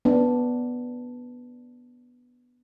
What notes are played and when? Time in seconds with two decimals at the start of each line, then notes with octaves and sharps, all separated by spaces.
0.05 B3 D4